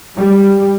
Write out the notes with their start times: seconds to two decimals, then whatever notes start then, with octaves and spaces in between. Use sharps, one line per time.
0.17 G3